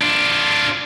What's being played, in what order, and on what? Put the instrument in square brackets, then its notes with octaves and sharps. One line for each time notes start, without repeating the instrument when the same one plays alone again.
[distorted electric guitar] D4 F4